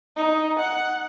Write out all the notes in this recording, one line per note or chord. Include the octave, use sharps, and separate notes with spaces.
D#4
F#5